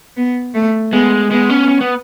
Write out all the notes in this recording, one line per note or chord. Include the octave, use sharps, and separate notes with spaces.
B3
A3
G#3 B3
G#3 B3
C#4
C#4
B3